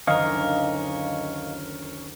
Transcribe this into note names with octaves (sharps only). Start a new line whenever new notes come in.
F#1 D2 D#3 C#4 A#4 D#5 F5